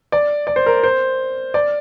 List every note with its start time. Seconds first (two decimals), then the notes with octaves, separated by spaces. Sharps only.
0.12 D5
0.47 D5
0.56 C5
0.66 A#4
0.83 C5
1.54 D5